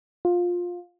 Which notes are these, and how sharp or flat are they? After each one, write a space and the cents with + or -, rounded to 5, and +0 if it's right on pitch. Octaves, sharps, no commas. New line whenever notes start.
F4 +15